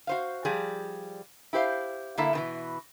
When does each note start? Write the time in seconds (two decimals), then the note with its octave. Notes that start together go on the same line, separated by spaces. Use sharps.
0.07 F#4 C5 F5
0.45 F3 G3 G#4
1.53 E4 G4 C5 F5
2.18 D3 A#3 E4 A4 E5
2.33 B2 D#3 E3